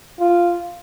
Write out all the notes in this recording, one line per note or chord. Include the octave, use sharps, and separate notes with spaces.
F4